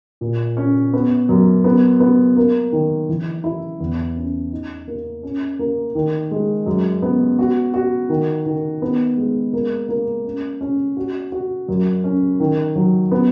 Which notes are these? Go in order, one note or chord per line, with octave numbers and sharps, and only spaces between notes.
A#2
C#4
B3
F#2
B3
B3
A#3
D#3
E3
E4
E2
C#4
D#4
A#3
C#4
A#3
D#3
G#3
F#2
B3
F#4
F#4
D#3
D#3
B3
G#3
A#3
A#3
C#4
C#4
F#4
F#4
F#2
C#4
D#3
F#3
B3